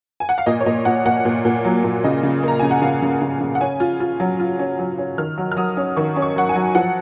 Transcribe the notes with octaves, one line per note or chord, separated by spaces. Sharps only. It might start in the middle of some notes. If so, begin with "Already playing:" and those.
G#5
F#5
F5
A#2 D#5
C#5
A#2 D#5
A#2 F#5
A#2 F#5
A#2
A#2
F#3
A#2
C#3 D#5
C#3
A#3 A#5
C#3 G#5
F#5
C#3 F5
C#3
C#3
C#3
F#5
C#4 G#5
F4
F4
F#3
F4
C#4
F#3
C#4
D#3 F6
F#3
F6
F#3 D#6
C#4
D#3 C#6
C#4
C#6
F#3 F#5
G#5
F#3
F3 F#5